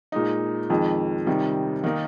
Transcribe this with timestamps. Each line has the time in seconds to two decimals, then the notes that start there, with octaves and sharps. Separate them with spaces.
0.12 A#2 G#3 D#4
0.70 F2 D#3 G#3
1.26 C3 D#3 G3
1.84 D#3 A#3 D#4